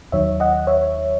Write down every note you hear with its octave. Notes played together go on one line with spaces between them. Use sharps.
D#2 D#3 F#3 C#5 E5
D#5 F#5
C#5 E5